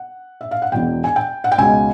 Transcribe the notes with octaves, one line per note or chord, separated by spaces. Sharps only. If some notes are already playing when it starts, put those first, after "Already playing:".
Already playing: F#5
E5
F5
F#5
E1 E2 B2 G5
G#5
G5
F#5
G5
C#2 B2 G#3 G#5